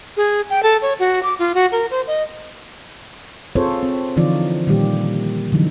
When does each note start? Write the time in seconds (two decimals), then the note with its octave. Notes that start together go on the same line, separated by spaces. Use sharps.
0.17 G#4
0.50 G5
0.63 A4
0.82 C#5
0.99 F#4
1.23 D6
1.39 F4
1.55 F#4
1.72 A#4
1.91 C5
2.07 D#5
3.55 C4 F4 G#4 A4 C5 C#5
3.83 C4
4.17 D3 E3 F3 D#4 F4 D5
4.67 A#2 D#3 G3 A#3 G4
5.52 D3 E3 F#3 D#4